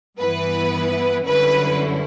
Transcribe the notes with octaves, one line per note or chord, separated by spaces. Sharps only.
G2 E3 B3 E4 B4
F#2 D3 G3 C#4 E4 B4